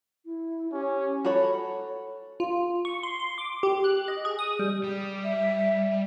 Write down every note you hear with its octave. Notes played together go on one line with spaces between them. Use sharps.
E4
C#4 G4
F#4 A4 C#5 B5
F4
C#6
C6
C6
D6
G4
F#6
D#5
G#4
D#6
G3
G3
E5